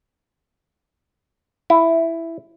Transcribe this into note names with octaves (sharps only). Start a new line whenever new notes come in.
E4